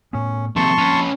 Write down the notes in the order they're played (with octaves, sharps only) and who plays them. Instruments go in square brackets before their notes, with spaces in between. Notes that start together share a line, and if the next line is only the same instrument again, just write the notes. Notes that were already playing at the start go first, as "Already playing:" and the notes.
[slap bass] A2 B3 [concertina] C#4
[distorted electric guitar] C3 D#3 [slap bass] F3 A#3 C4 [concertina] A5 C6 C#6
[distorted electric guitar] C#4 B4